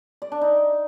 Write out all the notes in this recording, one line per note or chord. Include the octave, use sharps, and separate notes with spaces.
D5
D4
D#4